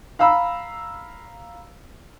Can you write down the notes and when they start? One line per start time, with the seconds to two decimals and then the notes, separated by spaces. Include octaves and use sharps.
0.19 F5 A#5 B5 E6